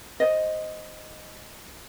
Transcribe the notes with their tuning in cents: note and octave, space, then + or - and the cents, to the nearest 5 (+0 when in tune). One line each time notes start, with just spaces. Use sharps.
C5 +0 D#5 +0